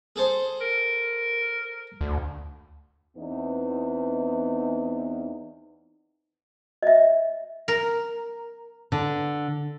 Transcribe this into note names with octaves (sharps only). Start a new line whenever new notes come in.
G#4 A4 C5
A#4
D2
E2 E3 B3 C4 D#4
D#5 E5
A#4
D3